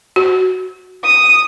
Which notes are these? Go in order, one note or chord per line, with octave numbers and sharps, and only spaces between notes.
F#4
D#6